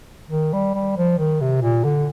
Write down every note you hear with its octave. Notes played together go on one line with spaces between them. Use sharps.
D#3
G3
G3
F3
D#3
C3
A#2
D3